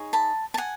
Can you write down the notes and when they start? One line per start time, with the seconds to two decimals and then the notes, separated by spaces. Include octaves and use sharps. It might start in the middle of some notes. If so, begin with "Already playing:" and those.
Already playing: D#4 G#4 C#5
0.13 A5 B5
0.54 A5
0.58 F#5 G#5